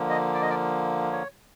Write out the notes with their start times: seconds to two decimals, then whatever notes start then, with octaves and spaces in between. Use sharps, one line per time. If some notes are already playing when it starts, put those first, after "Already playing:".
Already playing: D3 F3 A#3
0.10 D#5
0.34 D5
0.42 D#5
0.50 D5
1.12 C#5